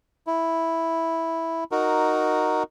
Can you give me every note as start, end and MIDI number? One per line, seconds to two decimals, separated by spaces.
0.27 1.64 64
1.72 2.63 63
1.72 2.63 66
1.72 2.63 70